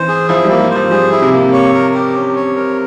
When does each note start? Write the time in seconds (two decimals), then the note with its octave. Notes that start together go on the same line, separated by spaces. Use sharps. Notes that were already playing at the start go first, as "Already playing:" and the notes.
Already playing: E3 C5
0.08 G#4
0.29 F3 E4
0.44 G3
0.50 A#3
0.60 G3
0.70 C5
0.76 F3
0.91 G3 G#4
1.11 E4
1.22 C3
1.32 A#3
1.53 C#5
1.74 A#4
1.94 G4
2.15 C#4
2.36 C#5
2.56 A#4